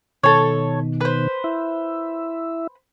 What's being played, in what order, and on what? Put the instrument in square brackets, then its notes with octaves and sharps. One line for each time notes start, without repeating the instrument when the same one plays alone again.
[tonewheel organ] B2 D#3 [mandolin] A4 C#5
[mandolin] B4 C5
[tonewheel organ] E4 E5